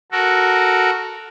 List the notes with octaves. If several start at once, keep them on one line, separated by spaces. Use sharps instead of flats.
F#4 A4 A#4